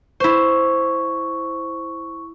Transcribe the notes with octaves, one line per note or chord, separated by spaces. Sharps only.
E4 C5 C#6